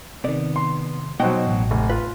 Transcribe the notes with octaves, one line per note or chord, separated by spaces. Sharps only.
C3 D#3 B3 D5
C6
B2 F#3 D#4 C5 D#5 F#5 G5
A1
F1
F4 B4